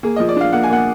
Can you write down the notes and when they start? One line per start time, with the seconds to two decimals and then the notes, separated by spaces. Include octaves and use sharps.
0.03 A#3 G#4
0.16 F3 D#5
0.29 D5
0.36 D4 F5
0.53 A#3 F#5
0.63 G#5
0.70 A#3 F#5